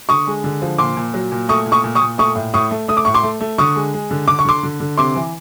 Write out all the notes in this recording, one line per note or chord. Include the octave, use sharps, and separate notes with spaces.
D3 C#6 D#6
G#3
D3
F3
A#2 C6 D6
A#2
F#3
A#2
A3 C#6 D#6
A#2
C#6 D#6
A#2
C#6 D#6
A#2
A3 C#6 D#6
A2
A2 C#6 D#6
A3
A3 D#6
D6
A2 C#6
C6 D6
A3
A3
D3 C#6 D#6
G#3
G#3
D3
D3 D6
C#6
D3 C6 D6
D3
D3
C3 C6 D6
E3